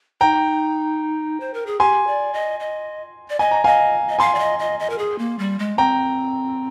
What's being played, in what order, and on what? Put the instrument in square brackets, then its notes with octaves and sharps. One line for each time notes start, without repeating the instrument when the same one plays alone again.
[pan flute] D#4 [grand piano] G5 A#5
[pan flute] C5
A#4
G#4
[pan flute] G4 [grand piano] G#5 C6
[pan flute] D5
D#5
D#5
D5
[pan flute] D#5 [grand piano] G#5
[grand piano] A#5
[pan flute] D#5 [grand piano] F5 G#5
[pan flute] D#5
[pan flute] F5 [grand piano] G#5 C6
[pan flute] D5
D#5
D#5
D#5
A#4
G#4
A#3
G3
G#3
[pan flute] C4 [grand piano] G5 A#5